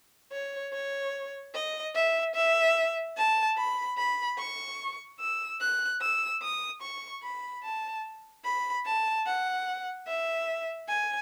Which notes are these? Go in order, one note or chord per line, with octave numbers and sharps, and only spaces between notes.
C#5
C#5
D#5
E5
E5
A5
B5
B5
C#6
E6
F#6
E6
D#6
C#6
B5
A5
B5
A5
F#5
E5
G#5